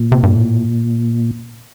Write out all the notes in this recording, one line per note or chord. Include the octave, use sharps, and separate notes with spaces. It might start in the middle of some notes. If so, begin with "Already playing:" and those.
Already playing: A#2
C3
G2
A2